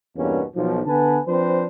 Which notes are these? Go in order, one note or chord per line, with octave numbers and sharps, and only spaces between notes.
E2 G2 B2 A#3 C#4
B1 F3
D3 B3 B4 G#5 A5
F3 C4 D4 B4 C5